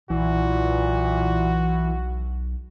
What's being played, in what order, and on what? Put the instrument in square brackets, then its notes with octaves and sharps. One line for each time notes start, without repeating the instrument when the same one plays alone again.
[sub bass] B1 [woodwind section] A#2 [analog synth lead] E3 [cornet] F#4